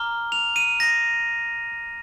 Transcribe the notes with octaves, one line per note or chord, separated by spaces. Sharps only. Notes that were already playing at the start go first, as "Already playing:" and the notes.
Already playing: A#5 D6 F6 G7
F7
D#7
A#6